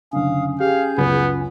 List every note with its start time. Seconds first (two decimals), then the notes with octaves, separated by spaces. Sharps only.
0.13 F#1 D3 C#4 F5 D#6
0.60 G4 G#4 F5 G6
0.98 C#2 F#2 B3